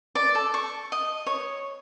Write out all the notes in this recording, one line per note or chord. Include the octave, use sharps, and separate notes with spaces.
D5
A4
C#6
D#5
C#5